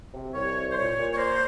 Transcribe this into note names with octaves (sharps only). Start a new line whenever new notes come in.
C3
C2 C#5
C2
C5
A#2 C#5
A#2
C#5
A#3 C5